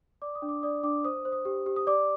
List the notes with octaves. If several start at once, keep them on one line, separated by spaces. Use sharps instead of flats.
D5 D6
D#6
D4
D6
D5 D#6
D4 D6
C5 D#6
C5
D#6
G4
G4
D#6
D5 D6